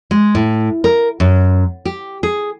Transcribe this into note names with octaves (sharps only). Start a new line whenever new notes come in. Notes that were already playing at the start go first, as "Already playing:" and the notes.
G#3
A2
A#4
F#2
G4
G#4